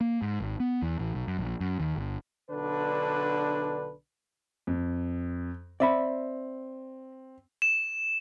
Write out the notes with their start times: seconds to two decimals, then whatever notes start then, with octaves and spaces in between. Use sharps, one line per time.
0.01 A#3
0.22 G#2
0.40 G#1
0.60 B3
0.82 E2
0.99 A1
1.15 B1
1.27 F#2
1.39 A#1
1.61 F#2
1.80 D#2
1.96 G1
2.50 B1 D3 D4 B4
4.67 F2
5.80 C4 D5 E5 B5
7.62 E7